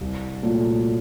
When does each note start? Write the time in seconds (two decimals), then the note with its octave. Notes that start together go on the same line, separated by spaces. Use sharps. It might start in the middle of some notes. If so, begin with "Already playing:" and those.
0.01 C2
0.42 A#2 F#3 A3